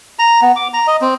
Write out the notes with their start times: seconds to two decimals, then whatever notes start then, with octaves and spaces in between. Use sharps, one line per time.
0.19 A#5
0.42 B3
0.56 D6
0.74 A#5
0.87 D#5
1.02 C4